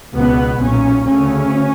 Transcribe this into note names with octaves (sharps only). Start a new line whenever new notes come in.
C#2 B2 B3
B1 A#2 C#4
D2 C#3 C#4